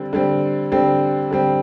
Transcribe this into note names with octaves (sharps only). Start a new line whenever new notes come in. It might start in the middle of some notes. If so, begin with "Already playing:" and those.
Already playing: D3 G3 C4
D3 G3 C4
D3 G3 C4
D3 G3 C4